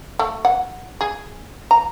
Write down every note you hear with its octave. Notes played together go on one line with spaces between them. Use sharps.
A3
F#5
G#4
A#5